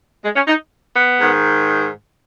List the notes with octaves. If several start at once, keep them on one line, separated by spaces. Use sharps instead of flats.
G#3
C#4
D#4
B3
G#2 D#3